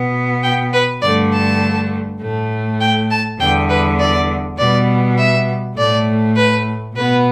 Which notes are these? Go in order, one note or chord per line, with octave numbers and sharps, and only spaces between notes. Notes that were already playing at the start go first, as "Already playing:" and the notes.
Already playing: B2 B3
G5
B4
G2 D3 A3 D5
A5
A2 A3
G5
A5
E2 D3 G3 B3 G5
B4
D5
B2 G3 B3 D5
E5
A2 A3 D5
B4
B2 B3 B4